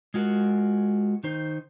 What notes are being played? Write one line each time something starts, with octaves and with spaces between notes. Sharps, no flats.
G#3 F4 F#4 A#4
D#3 D#4 C5